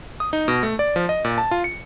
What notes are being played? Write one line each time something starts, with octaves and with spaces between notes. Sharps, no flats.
D#6
D#4
B2
A3
D5
F3
D#5
A#2
A5
F4
C#7